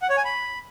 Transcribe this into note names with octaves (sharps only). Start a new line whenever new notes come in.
F#5
C#5
G#5
B5